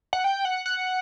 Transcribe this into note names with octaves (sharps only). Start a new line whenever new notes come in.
F#5
G5
F#5
F#5